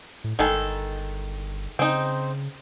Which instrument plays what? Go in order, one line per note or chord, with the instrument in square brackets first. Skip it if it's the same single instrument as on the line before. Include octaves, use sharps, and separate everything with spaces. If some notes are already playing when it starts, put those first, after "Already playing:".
[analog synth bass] A2
[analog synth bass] G1 [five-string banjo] D#3 G#3 A4
[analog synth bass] C#3 [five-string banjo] C4 D#4